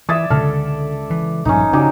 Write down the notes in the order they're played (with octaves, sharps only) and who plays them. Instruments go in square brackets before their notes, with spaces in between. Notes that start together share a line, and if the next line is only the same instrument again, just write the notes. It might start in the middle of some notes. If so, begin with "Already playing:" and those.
[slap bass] E3 [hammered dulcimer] D5 E5 [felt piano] D#6 G#6 A6
[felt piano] C#2 A5 F6 [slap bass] D3 [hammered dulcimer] A4
[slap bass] E3
[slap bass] A#1 G2 F3 [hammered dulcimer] C#4 D#4
[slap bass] C#3 C#4 [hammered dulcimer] F#3 D#4 G4 [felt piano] D5 G#5 D6